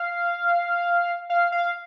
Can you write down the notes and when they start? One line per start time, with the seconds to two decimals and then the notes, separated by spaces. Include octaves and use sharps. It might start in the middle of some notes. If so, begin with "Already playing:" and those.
Already playing: F5
1.30 F5
1.52 F5